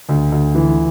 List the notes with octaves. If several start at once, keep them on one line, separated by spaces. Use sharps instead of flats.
D2
D2
E3